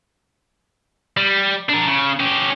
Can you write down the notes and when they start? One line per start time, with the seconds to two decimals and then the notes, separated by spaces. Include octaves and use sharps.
1.17 G3
1.69 D4 A#4
1.87 C#3
2.20 C#4 G4